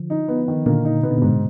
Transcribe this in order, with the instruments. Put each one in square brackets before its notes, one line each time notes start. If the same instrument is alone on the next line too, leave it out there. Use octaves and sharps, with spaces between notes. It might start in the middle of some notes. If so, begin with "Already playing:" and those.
Already playing: [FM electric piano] D3 F3
[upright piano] D#4
B3
D#3
[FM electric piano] A#2 D3 [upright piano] A#3
[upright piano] D#4
[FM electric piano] B2 [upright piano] B3
[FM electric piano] D3
[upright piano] G#2 [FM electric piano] B2